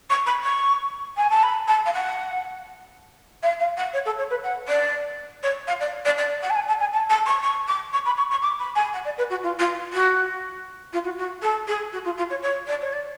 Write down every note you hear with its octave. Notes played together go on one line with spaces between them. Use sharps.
C#6
B5
C#6
G#5
A5
B5
A5
F5
F#5
F5
F5
F#5
C#5
A4
C#5
B4
F#5
D5
C#5
F5
D5
D5
D5
F#5
A5
G#5
A5
G#5
A5
A5
C#6
C#6
D6
C#6
B5
C#6
C#6
D6
B5
G#5
F#5
D5
B4
F#4
F4
F4
F#4
F4
F#4
F#4
A4
G#4
F#4
F4
F4
C#5
C#5
D5
C#5
D5